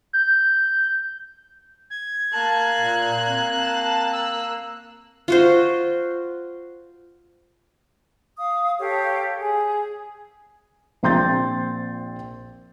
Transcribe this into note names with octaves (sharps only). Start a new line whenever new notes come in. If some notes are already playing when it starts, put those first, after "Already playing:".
G6
G#6
A#3 A5 F#6
A#2
C4
A5
E6
F4 F#4 C5
F5 D#6
G4 A4 C#5 F5
G#4
A#1 C4 C6 G6 A6